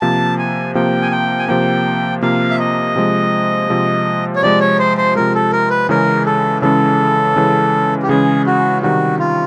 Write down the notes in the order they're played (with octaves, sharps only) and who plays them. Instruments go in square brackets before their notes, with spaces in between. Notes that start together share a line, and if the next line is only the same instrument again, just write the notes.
[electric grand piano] C3 F3 A#3 [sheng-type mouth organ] A5
[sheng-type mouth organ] G#5
[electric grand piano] C3 F3 A#3 [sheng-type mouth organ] G5
[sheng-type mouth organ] G#5
G5
G#5
[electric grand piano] C3 F3 A#3 [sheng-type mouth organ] G5
[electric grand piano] C3 F3 A#3 [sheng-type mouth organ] F5
[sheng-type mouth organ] E5
D#5
[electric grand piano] C3 F3 G#3
C3 F3 G#3
[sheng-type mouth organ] C#5
[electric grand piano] C3 F3 G#3 [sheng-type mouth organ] D5
[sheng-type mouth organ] C#5
C5
C5
[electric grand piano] C3 F3 G#3 [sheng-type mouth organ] A#4
[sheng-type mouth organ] A4
A#4
B4
[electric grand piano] C#3 E3 G#3 C#4 [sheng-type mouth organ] A#4
[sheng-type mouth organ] A4
[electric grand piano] C#3 E3 G#3 C#4 [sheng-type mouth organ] A4
[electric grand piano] C#3 E3 G#3 C#4
[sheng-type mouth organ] G4
[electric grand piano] C#3 E3 G#3 C#4 [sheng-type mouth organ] G#4
[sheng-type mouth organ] F#4
[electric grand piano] C3 D#3 G3 [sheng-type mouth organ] F#4
[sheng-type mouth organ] F4